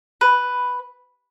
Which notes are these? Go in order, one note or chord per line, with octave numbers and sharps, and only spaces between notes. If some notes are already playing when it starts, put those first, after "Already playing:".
B4